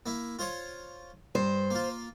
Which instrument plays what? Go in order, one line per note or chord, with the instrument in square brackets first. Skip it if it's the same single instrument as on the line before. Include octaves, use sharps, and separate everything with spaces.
[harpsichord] A#3 E4
F4 C5 C#5
[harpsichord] G2 [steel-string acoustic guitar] C5
[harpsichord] A#3 F4